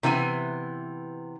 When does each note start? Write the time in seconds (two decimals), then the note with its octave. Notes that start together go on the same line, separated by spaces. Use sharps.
0.03 C3 E3 B3 E4 G#5